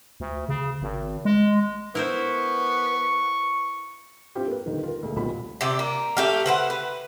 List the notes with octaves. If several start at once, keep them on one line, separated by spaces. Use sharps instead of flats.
D2
C#3
G#1
G#3
B3 E4 A#4 C5 C#6
C4 D4 E4 F4 G4 G5
A#3 B4
D#1 D3 D#3
F4 A#4
D2 A#2 G#3
D#1 B1 A#2 F4 B5
C3 G4 D5
A#3
A3 G4 F5
B4 C5 F#5
B4